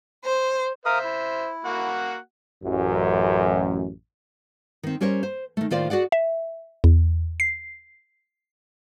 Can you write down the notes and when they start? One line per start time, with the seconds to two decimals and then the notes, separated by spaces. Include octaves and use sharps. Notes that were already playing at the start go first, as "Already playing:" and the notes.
0.24 C5
0.86 A#4 C5 E5 F5 D#6
1.04 E4
1.65 A#3 F#4 F#5
2.64 A1 F#2
4.83 D#3 C4
5.01 G3 C#4 A#4 C5 C#5
5.23 C5
5.57 D#3 A3
5.70 A2 D#3 F4 C5 D5 F5
5.90 F#4 G#4 D5 F#5
6.12 E5
6.84 E2
7.40 C7